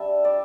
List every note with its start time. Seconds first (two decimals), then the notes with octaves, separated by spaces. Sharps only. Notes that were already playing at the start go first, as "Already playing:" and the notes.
Already playing: G3 D4 E5
0.25 D5